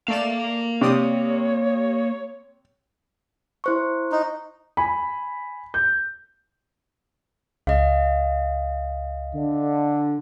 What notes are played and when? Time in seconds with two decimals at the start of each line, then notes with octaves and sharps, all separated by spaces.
0.08 A3 A#3 D5 F5 E7
0.81 C3 G4 C#5 D5 D#6
3.64 E4 C5 C#6
4.12 D#4
4.77 G#5 B5
5.74 G6
7.67 C#2 D#5 F5
9.35 D3